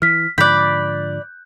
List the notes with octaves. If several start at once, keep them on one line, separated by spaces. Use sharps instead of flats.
E3 F6 B6
G#2 D3 F3 D5 B5 F#6 G6